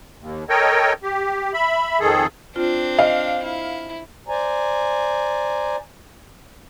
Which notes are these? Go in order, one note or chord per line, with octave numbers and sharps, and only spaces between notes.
D#2
A4 A#4 C#5 D#5 G5
G4
E5 B5
F2 D#3 G#4 A4
C4 D4 F4
D#5 F5
E4
C5 D5 G#5 A#5